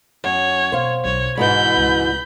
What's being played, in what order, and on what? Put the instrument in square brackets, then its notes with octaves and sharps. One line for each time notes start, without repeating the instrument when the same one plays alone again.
[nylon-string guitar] F#2 [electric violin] C#5
[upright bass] B2 [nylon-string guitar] C5 F5
[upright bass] B1 F#3 [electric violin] C#5
[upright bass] B1 [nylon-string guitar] G#2 B2 E3 [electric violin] B5 G6
[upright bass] C#2